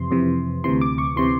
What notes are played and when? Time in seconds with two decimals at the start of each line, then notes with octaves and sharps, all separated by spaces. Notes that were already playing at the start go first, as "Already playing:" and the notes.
Already playing: F2 C3 E3 C6
0.11 F2 C3 E3
0.64 D2 C3 E3 C6
0.81 D6
0.98 C#6
1.16 C3 E3 C6